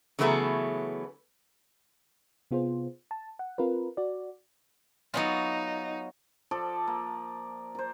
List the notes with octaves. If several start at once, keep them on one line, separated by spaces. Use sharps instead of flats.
C#3 E3 F#3 A3 B3 G#4
C3 B3 F4 G#4 C5
A5
F#5
C4 F4 A#4 B4
F#4 D5
F#3 B3 D#4 F4
F3 A4 D5
A#3
A#4 C5